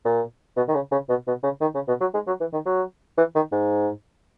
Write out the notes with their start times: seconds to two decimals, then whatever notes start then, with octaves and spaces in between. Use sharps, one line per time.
0.05 A#2
0.56 B2
0.68 D#3
0.74 C#3
0.91 C#3
1.09 B2
1.27 B2
1.43 C#3
1.61 D#3
1.74 C#3
1.88 B2
2.00 F#3
2.14 G#3
2.27 F#3
2.40 E3
2.52 D#3
2.65 F#3
3.17 E3
3.35 D#3
3.52 G#2